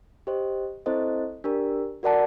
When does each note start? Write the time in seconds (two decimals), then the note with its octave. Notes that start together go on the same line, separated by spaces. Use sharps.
0.27 G4 C5 D#5
0.86 C4 E4 A4 C5 D#5
1.44 D4 G4 A#4
2.03 F#4 A#4 D5 F#5 A5